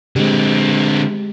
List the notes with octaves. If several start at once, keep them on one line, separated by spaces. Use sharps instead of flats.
D3 G#3 C4 G4